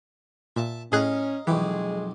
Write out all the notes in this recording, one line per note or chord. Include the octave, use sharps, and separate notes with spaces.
A#2 E5 A5
A2 C#4 G#4 D#5 F5 A#5 F#6
B1 F2 E3 G#3 G4 G#4